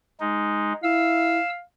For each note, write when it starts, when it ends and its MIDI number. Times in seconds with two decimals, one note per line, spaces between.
0.20 0.73 56
0.20 0.73 63
0.83 1.40 64
0.83 1.62 77
0.83 1.50 88